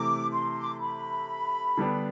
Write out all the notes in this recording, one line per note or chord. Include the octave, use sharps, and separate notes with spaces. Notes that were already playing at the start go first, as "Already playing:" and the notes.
Already playing: C3 E3 A3 E4 D6
C6
D6
C6
B5
D3 G3 B3 D4 G4